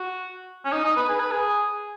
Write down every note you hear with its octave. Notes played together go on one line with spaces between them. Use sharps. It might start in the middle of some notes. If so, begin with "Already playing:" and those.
Already playing: F#4
C#4
D#4
D#4
B4
G#4
B4
G#4